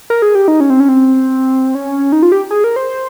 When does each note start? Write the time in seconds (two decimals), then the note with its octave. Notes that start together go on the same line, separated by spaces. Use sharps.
0.10 A#4
0.22 G#4
0.35 G4
0.48 D#4
0.60 C#4
0.70 C4
0.80 C#4
0.89 C4
1.75 C#4
2.12 D#4
2.22 F4
2.32 G4
2.51 G#4
2.64 A#4
2.76 C5